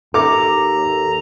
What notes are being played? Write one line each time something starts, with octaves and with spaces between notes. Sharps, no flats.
D#2 A4 A#5 D6